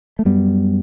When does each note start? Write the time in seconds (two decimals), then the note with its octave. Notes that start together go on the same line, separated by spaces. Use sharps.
0.19 A3
0.25 F#2 G3 B3